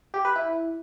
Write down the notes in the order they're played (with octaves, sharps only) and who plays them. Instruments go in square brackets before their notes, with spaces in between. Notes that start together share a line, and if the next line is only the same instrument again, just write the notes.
[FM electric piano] G4
B4
E4